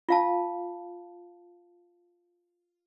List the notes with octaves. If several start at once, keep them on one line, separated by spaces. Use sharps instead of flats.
F4 F5 A5